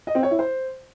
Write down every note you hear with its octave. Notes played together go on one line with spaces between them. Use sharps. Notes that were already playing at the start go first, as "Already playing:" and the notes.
D#5
C4
C#5
E4
C5